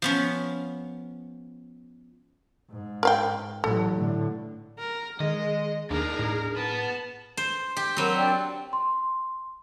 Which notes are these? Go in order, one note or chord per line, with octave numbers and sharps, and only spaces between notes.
F3 B3 C#4
G#2
A#4 F5 G5
A1 F#3 A4
A2 D3
A#4
D#3 G#3 D#5
D#2 D4 D#4 G#4 A#4
A2
B3 A5
C5
G4
F#3 C4 A#4 B5
D4 D5 G5
C6